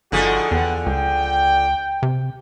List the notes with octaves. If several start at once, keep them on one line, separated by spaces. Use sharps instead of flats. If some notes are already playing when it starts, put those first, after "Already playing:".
G1 D3 F3 D#4 F#4 G#4
E2 B4 F#5 G5
C#2 G5
C3